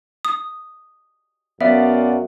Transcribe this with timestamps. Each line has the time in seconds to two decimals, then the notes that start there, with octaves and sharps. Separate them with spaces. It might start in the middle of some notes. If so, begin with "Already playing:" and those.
0.25 D#6
1.61 F#2 B3 D5 E5 F5